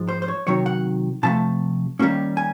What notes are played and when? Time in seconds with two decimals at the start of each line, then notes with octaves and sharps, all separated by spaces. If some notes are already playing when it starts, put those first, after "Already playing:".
Already playing: G#2 F3 G#3
0.08 C5
0.22 C5
0.28 C#5
0.47 C3 D#3 F#3 C#5
0.66 F#5
1.23 C3 F3 A3 A5
1.99 D#3 G3 A#3 C#4
2.37 G#5